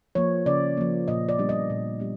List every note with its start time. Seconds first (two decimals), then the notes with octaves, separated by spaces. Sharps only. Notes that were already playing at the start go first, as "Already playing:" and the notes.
0.15 F3 A#3 C#5
0.46 C#3 D5
0.77 F3 A#3
1.08 A#2 D#5
1.29 D5
1.39 G3 B3 D4
1.49 D#5
1.70 A#2
2.00 G3 B3 D4